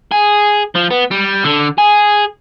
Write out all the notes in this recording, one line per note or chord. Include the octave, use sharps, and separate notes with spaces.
G#4
F3
B3
G3
D3
G#4